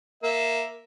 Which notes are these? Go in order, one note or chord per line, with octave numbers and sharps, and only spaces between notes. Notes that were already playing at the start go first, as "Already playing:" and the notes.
A#3 E5